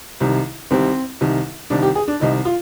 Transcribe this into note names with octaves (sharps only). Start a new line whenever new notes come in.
C2 C3 D#3
C2 C3 D#3 C4
C2 C3 D#3
C2 C3 D#3 D4
G4
G#4
D4
C2 C3 D#3 D#4
F4